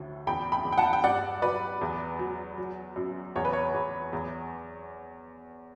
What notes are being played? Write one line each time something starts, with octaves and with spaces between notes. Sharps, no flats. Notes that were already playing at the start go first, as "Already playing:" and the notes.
Already playing: D2 A2
E2 G5 B5
G5 B5
E2
G5
F#5 A5
G5
G2 D5 F#5
F#3 B4 D5
E2
F#3
F#3
F#2
E2 C#5
B4
C#5
E2
E2